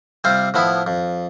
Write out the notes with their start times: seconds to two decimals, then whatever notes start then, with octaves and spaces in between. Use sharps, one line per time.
0.24 C3 G3 C4 F4 C5
0.54 A2 F3 B3 E4
0.87 F2